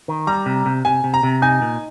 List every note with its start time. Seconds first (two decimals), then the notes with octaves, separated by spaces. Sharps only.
0.08 D#3
0.27 G3 A#5
0.46 C3
0.66 C3
0.85 C3 G#5
1.04 C3
1.14 A#5
1.23 C3
1.42 D#4 G#5
1.62 A#2